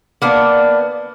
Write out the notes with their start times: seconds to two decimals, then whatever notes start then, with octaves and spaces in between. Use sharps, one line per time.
0.22 A#3 B3 D4